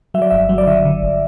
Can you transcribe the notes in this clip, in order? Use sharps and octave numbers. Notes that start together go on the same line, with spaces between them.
F#3 E5
D5
G1 E5
F#3
D5
D3 E5
D3
G1